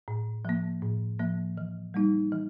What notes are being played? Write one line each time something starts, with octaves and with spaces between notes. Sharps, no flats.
A2
F3 A#3
A2
F3 A#3
E3
G3 A#3 D#4
E3